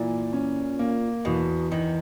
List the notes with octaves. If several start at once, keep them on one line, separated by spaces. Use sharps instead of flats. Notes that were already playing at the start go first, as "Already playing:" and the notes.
Already playing: A#2 E3
C#4
A#3
E2 B2
E2 D#3